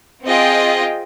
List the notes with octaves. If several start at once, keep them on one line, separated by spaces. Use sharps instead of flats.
C4 F4 G#4 D#5 G5